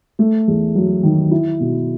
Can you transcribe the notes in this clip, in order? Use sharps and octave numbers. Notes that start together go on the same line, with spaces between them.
A3
E2
F#3
D#3
E4
B2